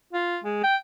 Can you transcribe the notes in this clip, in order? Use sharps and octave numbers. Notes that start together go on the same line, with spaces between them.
F4
G#3
G5